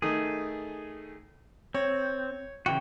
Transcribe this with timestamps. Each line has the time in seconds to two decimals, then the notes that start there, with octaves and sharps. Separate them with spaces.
0.02 D#3 A3 G#4
1.74 C4 C#5
2.66 C#3 E3 F#4 G5